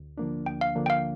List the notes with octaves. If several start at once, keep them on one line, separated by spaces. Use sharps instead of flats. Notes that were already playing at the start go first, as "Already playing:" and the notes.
Already playing: D2
D3 F3 A#3 D4
D2 G5
F5
D3 F3 A#3 D4
G5
F5